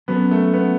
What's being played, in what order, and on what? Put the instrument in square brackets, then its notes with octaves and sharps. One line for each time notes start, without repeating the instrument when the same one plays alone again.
[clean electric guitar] F#3 C#4 F#4 A4 [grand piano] B3
[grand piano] A3
B3